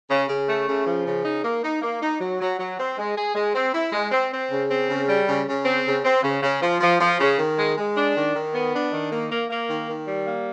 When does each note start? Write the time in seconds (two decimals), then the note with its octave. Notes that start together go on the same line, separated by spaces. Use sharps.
0.10 C#3
0.28 C#3
0.48 A3
0.67 C#3
0.86 F3
1.05 C#3
1.25 D#4
1.44 A#3
1.63 D#4
1.81 A#3
2.02 D#4
2.20 F#3
2.40 F#3
2.59 F#3
2.78 C4
2.98 G#3
3.16 G#4
3.35 G#3
3.54 C4
3.73 E4
3.92 G#3
4.12 C4
4.32 C4
4.51 C#3
4.69 C4
4.89 C#3
5.08 G3
5.27 C#3
5.47 C#3
5.65 C4
5.85 C#3
6.05 C4
6.23 C#3
6.42 C#3
6.61 F3
6.80 F3
7.00 F3
7.19 C#3
7.38 D#3
7.57 G#3
7.77 G#3
7.96 D4
8.15 D#3
8.34 D#3
8.53 B3
8.73 D4
8.92 D#3
9.11 A#3
9.31 A#3
9.50 A#3
9.69 D#3
9.88 D#3
10.06 G3
10.26 A#3